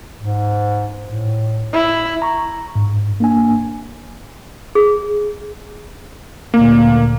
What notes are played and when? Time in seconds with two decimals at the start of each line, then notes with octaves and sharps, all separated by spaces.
0.19 G#2
1.05 A2
1.73 E4
2.22 A#5 C#6
2.75 G#2
3.20 A#3 D4 G#5
4.75 G#4
6.54 D2 A#2 A#3